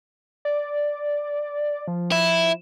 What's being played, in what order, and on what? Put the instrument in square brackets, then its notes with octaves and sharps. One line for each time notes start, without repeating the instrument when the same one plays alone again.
[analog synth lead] D5
F3
[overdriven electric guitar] E4